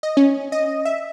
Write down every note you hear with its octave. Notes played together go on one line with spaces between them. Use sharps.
D#5
C#4
D#5
E5